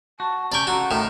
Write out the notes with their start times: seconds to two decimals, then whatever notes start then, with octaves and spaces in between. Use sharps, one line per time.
0.20 F#4 A5
0.52 C3 C#4 D5 G5 A#5 C#6
0.67 C#3 F4 F#4 A4 A#5
0.91 A2 D#3